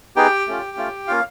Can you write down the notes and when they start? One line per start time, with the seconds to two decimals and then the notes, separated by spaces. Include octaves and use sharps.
0.16 B3 D#4 G4 G#4 G5
0.48 A3 C#4 F4
0.77 A3 C#4 F4
1.07 A#3 C#4 F4 F5